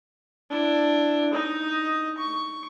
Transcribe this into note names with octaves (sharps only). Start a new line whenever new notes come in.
D4 E4
D#4 D#5
C#6